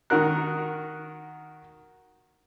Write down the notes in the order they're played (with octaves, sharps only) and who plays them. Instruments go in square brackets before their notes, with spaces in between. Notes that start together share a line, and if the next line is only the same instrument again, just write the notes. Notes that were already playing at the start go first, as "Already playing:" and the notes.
[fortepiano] D#3 F#4 A#4 F#6